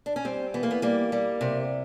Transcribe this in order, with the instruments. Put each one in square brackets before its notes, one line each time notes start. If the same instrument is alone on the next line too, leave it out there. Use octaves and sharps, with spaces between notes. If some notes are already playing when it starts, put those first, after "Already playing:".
[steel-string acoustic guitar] D4
C#4
G3 C4
E3 B3
A#3
B3
G3 A#3
G3
C3